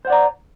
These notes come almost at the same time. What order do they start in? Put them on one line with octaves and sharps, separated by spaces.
C5 F#5 D5 A#5